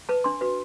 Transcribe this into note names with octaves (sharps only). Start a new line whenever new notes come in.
B4 A5
D4 C6
F#4 B4